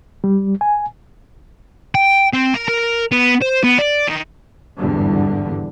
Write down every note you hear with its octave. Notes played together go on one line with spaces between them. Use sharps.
G3
G#5
G5
C4
A#4
A#4
B3
C5
B3
D5
D#3
G#1 E2 G2 D3 E3 G3